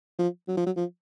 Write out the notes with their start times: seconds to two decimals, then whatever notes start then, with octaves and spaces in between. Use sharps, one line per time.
0.19 F3
0.48 F#3
0.57 F3
0.66 F#3
0.76 F3